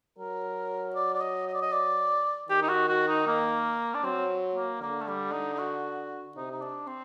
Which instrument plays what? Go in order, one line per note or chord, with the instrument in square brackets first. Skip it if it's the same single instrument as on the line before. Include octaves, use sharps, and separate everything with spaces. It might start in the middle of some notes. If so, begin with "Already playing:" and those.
[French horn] F#3 [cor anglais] A#4
[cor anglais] D5
D5
D#5
D#5
D5
D#5
D5
[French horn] D#3 [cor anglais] G4
[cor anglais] D#4
F#4
F#4
D#4
A#3
D4
[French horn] F#3 [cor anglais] C4
[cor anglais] A#3
[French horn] D3 [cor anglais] A#3
[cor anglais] A3
G3
D#4
D#4
F#4
[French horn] C3 [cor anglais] D#4
[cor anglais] D#4
D4
C4